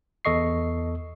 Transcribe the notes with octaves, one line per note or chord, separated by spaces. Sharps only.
E2 A4 D#5 C#6 C7